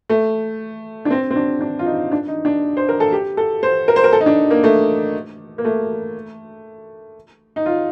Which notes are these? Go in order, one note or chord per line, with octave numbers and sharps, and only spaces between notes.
A3
D4
C4
C4
D4
D4
F4
D#4
D4
D#4
D4
C5
A#4
A4
G4
A4
C5
A#4
C5
A#4
A4
D#4
D4
A#3
A3
A#3
A3
D#4
F4